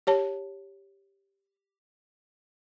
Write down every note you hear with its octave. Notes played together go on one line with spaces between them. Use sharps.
G4 C#5 A5